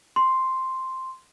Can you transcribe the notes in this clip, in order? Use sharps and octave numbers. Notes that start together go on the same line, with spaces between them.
C6